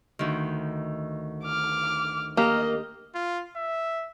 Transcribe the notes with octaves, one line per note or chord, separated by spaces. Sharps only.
D2 D#3
D6 F6
A#3 G4 D#5 F6
F4
E5